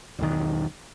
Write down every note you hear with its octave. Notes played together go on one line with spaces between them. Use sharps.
E1 B1 D#3